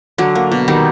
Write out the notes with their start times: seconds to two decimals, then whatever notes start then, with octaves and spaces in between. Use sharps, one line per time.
0.18 D3 F#3 D4
0.35 A#3
0.52 B2
0.68 D#3 G3 D#4